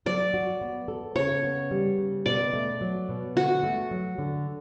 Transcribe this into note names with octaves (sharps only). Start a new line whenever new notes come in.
F#3 D5
F#4
B3
A4
C#3 C#5
B3
G3
C#3
B2 D5
A3
F#3
B2
D3 F#4
A3
F#3
D3